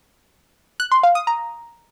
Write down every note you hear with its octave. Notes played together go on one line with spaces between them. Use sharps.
F#6
C6
F5
D#6
A#5